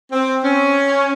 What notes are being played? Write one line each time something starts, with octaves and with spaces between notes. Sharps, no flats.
C4
C#4